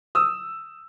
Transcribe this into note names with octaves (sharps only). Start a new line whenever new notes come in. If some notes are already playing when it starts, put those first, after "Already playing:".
D#6 E6